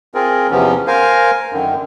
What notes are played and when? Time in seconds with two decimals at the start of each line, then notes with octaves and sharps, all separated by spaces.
0.15 C4 F4 G#4 A#4
0.51 E2 C3 F3 B3 C#4
0.87 A#4 C5 F5 G#5
1.53 F#2 D3 D#3